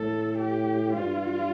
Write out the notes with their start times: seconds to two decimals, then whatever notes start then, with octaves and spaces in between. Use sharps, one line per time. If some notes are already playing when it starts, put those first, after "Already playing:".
Already playing: A2 A4
0.39 G4
0.95 G2 F4